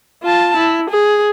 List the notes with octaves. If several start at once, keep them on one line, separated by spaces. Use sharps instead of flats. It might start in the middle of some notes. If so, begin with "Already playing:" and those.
F4 A5
E4
G#4